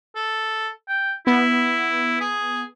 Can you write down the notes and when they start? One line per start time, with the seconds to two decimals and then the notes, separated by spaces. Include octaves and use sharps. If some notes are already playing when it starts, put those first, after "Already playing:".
0.16 A4
0.88 G5
1.27 B3 E4
2.21 G#4